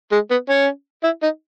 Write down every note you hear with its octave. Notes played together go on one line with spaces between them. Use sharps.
G#3
B3
C#4
E4
D#4